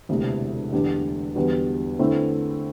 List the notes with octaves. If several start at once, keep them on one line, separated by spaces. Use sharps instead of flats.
E1 D2 C3 E3
E2 D3 A3 D4 G4
E2 D3 G3 B3 F#4
D3 A3 C4 E4